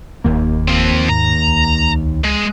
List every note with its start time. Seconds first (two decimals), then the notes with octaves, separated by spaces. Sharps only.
0.24 F1 D#2 A#3
0.68 F3 C4
1.09 G#2 A#5
1.48 C#2
2.24 G#3